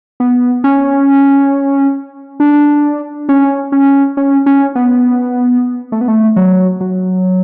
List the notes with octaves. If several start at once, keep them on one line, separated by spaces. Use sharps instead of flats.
B3
C#4
D4
C#4
C#4
C#4
C#4
B3
A3
B3
A3
F#3
F#3